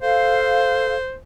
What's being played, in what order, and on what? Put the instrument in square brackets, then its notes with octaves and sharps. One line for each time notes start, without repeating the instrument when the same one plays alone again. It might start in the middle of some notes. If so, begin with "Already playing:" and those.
[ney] A4 [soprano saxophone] C5 [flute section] F5